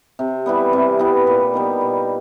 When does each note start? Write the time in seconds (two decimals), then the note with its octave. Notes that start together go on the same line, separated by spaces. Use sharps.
0.19 C3
0.46 E3 G3 B3
0.73 C3
0.99 E3 G3 B3
1.27 A#2
1.54 G3 B3 D#4
1.81 A#2